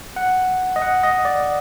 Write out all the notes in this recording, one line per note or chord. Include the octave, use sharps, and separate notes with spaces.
F#5
D#5
F#5
D#5
D5